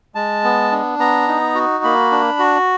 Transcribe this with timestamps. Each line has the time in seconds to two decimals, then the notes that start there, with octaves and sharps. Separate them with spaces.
0.15 G#3 A5
0.44 B3
0.71 D4
0.99 B3 A#5
1.28 D#4
1.55 F#4
1.84 A#3 B5
2.11 D4
2.39 F#4